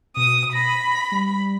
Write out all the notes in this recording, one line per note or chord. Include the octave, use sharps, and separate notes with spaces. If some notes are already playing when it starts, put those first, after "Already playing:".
B2 D#6
B5 A#6
G3